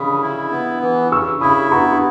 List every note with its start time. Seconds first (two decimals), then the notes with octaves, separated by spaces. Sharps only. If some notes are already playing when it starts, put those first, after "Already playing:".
Already playing: C#3 B5 D#6
0.22 E4
0.52 B3
0.82 E3
1.12 C#3 C#6 E6
1.41 E4 B5 D#6
1.71 B3 A#5 C#6
1.93 C#6